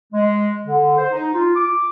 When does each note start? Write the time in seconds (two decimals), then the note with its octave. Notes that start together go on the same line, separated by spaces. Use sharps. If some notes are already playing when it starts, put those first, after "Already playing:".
0.13 G#3
0.65 D3
0.98 C5
1.12 D#4
1.33 F4
1.55 D6